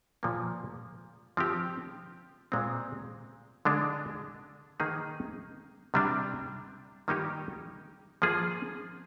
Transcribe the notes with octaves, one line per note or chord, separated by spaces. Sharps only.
A#2 F3 A#3
F3 C4 G4
A#2 G#3 C4
D3 G#3 D4
D#3 A#3 D#4 G#4
C3 G3 D4
D#3 G3 A#3 D#4 G4
F3 A#3 F4 G#4